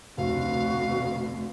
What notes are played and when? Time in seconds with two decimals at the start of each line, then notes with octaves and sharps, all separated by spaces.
0.17 F1 D2 B2 F#4 F5